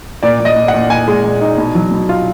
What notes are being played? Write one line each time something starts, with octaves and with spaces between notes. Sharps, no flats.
A#2 D5
A#2
D#5
A#2
F#5
A#2
A#2 G#5
G#3
A#2
D#4
B2
F#3
B2
F4